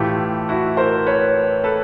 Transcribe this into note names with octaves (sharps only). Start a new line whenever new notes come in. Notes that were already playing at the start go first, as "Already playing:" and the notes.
Already playing: A2 E3 A3 F4 G4
E4 F#4
A#4 C5
B4 C#5
A4 B4